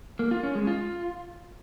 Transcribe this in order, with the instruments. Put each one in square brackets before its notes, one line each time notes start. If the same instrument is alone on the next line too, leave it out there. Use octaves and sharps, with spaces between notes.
[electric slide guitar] A#3
F4
C#4
G#3
F4